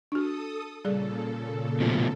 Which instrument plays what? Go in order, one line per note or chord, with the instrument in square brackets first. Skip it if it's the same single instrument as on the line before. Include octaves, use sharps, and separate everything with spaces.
[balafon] D4 F#4 [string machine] A4 D#6
[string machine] A#2 C#3 A4 [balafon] G3 G#4 D5
[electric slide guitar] B2 F3 A3